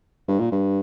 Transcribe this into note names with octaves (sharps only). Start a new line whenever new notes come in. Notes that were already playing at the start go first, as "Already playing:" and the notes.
G2
A#2
G2